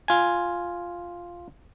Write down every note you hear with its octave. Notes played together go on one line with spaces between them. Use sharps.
F4 G#5